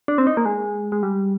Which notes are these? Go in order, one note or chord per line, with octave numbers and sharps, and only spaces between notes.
D4
C4
D#4
A#3
G#3
G#3
G3